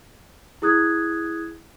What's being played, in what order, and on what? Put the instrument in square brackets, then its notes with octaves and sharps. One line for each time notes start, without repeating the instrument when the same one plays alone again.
[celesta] E4 G#4 D#6 F#6 G#6